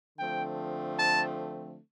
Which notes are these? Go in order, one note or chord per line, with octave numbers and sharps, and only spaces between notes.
D3 F3 A3 C4 G5
A5